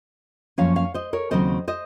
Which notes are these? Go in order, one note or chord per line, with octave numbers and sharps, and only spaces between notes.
F#2 F3 A#3 C#4 C#5 F5
C#5 F5
C5 D#5
A#4 C#5
D#2 C#3 F#3 C4 C5 D#5
C5 D#5